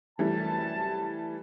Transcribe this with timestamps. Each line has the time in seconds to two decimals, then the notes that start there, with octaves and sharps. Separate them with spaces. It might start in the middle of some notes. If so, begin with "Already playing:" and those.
0.19 F#2 C3 E3 G3 A3 A5